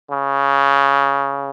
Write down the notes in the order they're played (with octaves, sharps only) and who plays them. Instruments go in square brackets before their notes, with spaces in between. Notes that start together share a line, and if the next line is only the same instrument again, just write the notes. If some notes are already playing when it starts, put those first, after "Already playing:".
[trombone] C#3